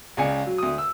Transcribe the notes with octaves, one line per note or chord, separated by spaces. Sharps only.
C#2 C#3 D5 G#5 C#7
F#3
D2 D#6
E6